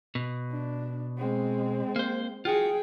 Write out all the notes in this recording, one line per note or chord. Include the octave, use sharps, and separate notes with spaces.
B2
D4
G#3 C4
A#3 C5
F4 F#4 G#4 G5